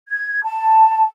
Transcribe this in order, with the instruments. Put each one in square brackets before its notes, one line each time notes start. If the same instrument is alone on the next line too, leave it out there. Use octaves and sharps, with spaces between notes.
[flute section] G#6
A5